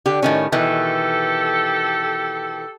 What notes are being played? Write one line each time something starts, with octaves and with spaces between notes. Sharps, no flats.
D3 G4
A2 D#3 C#4
B2 D#3 E3 G4 A4